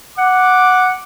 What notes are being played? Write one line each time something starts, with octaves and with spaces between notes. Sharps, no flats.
F#5 D6